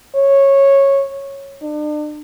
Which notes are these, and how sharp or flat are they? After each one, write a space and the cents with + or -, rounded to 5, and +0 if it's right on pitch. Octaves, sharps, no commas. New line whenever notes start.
C#5 -10
D4 +40